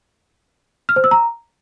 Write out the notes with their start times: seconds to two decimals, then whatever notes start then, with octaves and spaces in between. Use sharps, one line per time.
0.89 F6
0.96 C5
1.04 E6
1.11 A#5